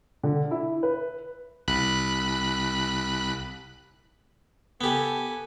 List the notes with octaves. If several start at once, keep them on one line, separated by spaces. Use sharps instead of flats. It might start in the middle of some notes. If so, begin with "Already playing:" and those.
D3
E4
B4
C2 B5 F#6
B3 G4 A4 G#5